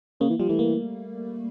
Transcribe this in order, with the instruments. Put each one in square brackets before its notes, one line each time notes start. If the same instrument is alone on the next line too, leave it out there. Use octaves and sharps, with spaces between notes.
[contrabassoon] C#3 [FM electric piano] A#3
[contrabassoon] E3
[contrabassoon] F3 [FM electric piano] G3
[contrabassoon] E3 [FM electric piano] A3
[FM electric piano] A#3